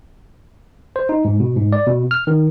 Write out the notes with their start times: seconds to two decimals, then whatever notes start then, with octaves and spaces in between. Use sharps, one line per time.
0.96 C5
1.09 D#4
1.25 G#2
1.40 B2
1.56 G#2
1.73 D5
1.87 B2
2.11 F6
2.27 D#3